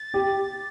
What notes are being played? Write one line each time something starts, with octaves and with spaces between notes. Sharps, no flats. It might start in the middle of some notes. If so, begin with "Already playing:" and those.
Already playing: A6
G4